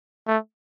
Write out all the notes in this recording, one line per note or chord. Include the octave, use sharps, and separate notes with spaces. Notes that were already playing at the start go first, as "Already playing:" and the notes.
A3